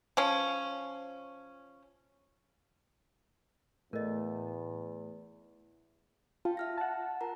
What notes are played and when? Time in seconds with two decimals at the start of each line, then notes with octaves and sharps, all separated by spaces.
0.17 F3 C#4
3.93 E2 A2 A#4 D#5
6.45 F4 F5 G5 A5
6.57 E5 F6 A#6
6.78 F#5 A5
7.21 F4 A#4 A#5